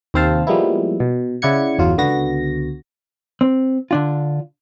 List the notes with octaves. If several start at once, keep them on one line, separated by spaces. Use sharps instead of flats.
D#2 C3 C4 C5 F5 A5
F3 G3 G#3 A#3 B3 E4
B2
C#3 E4 D5 F#5 G#6 C#7
G1 E2 F#3 F4
C#2 D3 B3 F#4 A#6
C4
D3 D4 F4